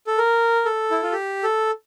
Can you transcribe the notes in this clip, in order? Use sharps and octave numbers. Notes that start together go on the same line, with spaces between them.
A4
A#4
A4
E4
F4
G4
A4